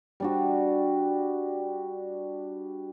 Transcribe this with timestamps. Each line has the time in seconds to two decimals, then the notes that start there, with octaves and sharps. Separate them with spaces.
0.20 G3 D4 F#4